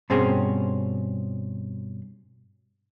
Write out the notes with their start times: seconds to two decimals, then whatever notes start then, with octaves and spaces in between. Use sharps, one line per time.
0.10 G2 B2 C4 C#4 G#4